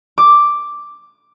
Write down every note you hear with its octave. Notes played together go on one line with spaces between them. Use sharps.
D6